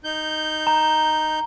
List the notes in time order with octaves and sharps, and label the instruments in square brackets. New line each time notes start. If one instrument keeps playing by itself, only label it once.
[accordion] D#4 G6
[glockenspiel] A#5